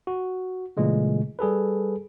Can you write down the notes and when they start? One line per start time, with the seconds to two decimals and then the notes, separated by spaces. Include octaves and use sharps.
0.07 F#4
0.77 A#2 C#3 E3 G#3 A3
1.39 G3 G#4 A4 B4